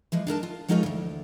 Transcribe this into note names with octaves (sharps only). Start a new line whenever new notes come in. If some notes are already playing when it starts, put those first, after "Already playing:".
E3 F3 G#3
D4 D#4 A#4 A5
F4
F3 G#3 D#4 F4 A#4 C#5
D2 E3